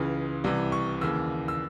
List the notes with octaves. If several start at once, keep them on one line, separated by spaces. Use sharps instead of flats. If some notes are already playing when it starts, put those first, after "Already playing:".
Already playing: C#2 C#3 E3 D#6
C2 C3 E3
C#6
D#2 C#3 E3 E6
E6